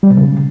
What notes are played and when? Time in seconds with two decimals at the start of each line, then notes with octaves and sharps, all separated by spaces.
0.03 G3
0.10 B2
0.17 C#3